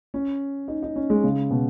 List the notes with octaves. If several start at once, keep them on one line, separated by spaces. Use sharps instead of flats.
C#4
D#4
D#4
C#4
G#3
C#3
B2